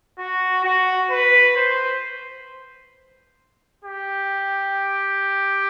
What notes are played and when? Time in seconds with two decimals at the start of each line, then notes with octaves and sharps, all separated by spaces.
0.19 F#4
0.64 F#4
1.10 B4
1.56 C5
3.84 G4